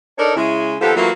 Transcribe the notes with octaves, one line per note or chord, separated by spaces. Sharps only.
D4 D#4 A4 A#4 C#5 D5
C#3 G#3 E4
D#2 F3 B3 G4 A4
E3 F#3 A3 A#3 E4 F4